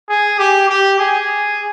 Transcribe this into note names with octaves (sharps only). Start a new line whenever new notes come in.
G#4
G4
G4
G#4